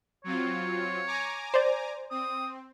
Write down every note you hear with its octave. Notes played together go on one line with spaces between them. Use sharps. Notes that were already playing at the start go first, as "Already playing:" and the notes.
F#3 C4 F4 C#5
G#5 A#5 D6
C5 D5
C4 D#6